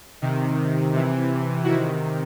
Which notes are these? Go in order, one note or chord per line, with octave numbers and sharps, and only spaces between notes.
C3 D#3
C3 E3
C3 D#3 E4 F#4